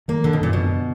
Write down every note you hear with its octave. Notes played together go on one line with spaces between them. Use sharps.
D#3 A#3
D3 D#3
B2
F#2 A#2
B2 D3
D3